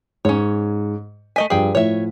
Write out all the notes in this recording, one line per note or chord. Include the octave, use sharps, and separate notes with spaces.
G#2 C#4 C#5
A3 D#5 G#5 B6 D#7
G2 F3 G#4 G5
A2 F3 C#5 E5